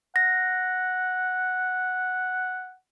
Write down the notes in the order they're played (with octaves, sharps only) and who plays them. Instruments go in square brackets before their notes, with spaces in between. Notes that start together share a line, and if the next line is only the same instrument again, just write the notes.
[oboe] F#5 [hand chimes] A#6